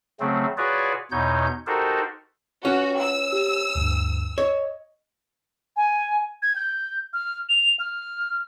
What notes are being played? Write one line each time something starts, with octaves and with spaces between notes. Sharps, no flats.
C#3 F#3 A3 C4
F4 F#4 G#4 B4 C#5 D5
E2 B2 D#4 C#5 G6
D#4 F#4 G4 A4 A#4 C5
C#4 F4 F#4 B4
E6
G4
D2 G2
C#5 D#5
G#5
G#6
G6
F6
F7
F6